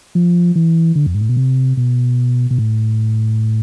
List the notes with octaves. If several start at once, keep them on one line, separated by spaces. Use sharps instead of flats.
F3
E3
D3
F2
G#2
A2
B2
C3
B2
B2
A2